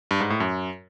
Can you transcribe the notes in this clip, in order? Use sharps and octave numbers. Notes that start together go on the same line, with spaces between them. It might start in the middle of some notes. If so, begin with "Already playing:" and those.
G2
G#2
A2
F#2